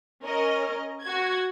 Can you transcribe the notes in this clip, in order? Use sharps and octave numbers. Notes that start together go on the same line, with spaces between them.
C#4 A#4 D#5
F#4 G#6